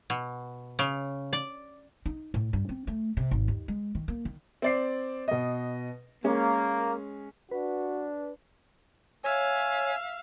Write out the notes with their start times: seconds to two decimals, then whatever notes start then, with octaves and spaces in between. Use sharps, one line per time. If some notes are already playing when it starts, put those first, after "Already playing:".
0.10 B2
0.79 C#3
1.33 D5
2.06 D#4
2.34 A2
2.53 G2
2.69 C4
2.87 A3
3.17 C3
3.31 G#1
3.48 D#2
3.68 G#3
3.95 D#3
4.08 A#3
4.25 D#3
4.62 C4 D5 C7
5.28 B2 D#5
6.24 G#3 A#3 C#4
7.51 D4 F#4 B4
9.24 C#5 E5 F5 G#5